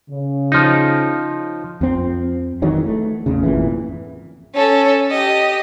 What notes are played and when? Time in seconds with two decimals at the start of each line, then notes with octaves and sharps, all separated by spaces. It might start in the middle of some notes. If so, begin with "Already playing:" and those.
0.10 C#3
0.52 F3 D#4
1.81 F2 C4
2.62 D#3 E3 F#3 G#3
2.86 A3
3.26 A1 E2 C#3
3.43 G#1 F2 A#2 E3
4.55 C#4 A4
5.11 G4 D#5